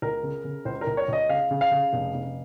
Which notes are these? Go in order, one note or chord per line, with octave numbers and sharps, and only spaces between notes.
C#2 A#4
C#3
C#3
C#2 C5
A#4
C#2
C#5
C#2 D#5
C#3 F5
C#3
F5
C#3
F1
F1